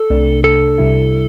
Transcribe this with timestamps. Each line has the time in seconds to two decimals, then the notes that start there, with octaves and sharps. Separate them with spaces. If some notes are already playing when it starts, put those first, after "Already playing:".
Already playing: A4
0.10 C2 C3 A3 D4
0.44 A4
0.78 C2 C3 G3 E4